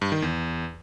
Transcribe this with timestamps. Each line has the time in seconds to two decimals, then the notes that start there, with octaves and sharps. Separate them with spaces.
0.01 G2
0.12 D#3
0.22 E2